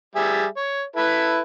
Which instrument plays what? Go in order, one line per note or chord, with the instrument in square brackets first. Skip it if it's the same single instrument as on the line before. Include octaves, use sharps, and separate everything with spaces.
[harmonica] G3 G#4 E5
C#5
E4 A4 B4